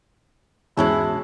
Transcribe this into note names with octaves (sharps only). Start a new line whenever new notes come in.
E2 G#2 G#3 C#4 E4 F#4 A5